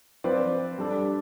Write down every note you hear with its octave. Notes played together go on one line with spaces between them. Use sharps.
F3 C4 F4 B4 D5
G3 D4 A4 D5